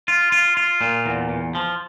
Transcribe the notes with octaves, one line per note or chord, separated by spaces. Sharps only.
F4
F4
F4
A#2
E2
E2
F3